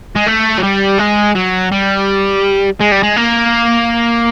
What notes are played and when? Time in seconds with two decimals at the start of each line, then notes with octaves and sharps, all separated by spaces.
0.16 G#3
0.27 A3
0.59 F#3
0.64 G3
0.99 G#3
1.36 F#3
1.72 G3
2.80 G#3
2.92 G3
3.03 G#3
3.16 A#3